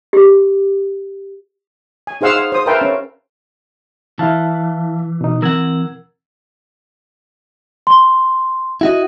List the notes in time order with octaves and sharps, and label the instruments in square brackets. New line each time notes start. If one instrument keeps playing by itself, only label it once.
[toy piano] G4
[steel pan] G#5
D#4 G#4 C5 F5 F#5 E6
F5
C5 D#6
A#4 B4 E5 F5 G5 A5
C#4
[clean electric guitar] E3 [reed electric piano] E4 F5 A5
[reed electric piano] B2 D#4
[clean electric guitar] E3 C4 F#5 [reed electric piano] A#4 E6 G#6
[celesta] C6
[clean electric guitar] E4 F#4 D#5